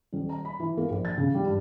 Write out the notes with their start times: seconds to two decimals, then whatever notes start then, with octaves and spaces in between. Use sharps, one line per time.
0.13 D#1
0.29 A#5
0.45 B5
0.60 E3
0.77 A#3
0.90 A#1
1.05 A6
1.17 C#3
1.34 G3
1.46 G2